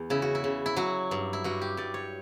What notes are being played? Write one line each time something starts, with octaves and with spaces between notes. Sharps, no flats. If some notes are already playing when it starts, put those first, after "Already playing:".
Already playing: E2
C#3 E4
F#4
E4
C#3
E4
F#3 F#4
G2
E4
G2 F#4
G4
G2 D5
C#5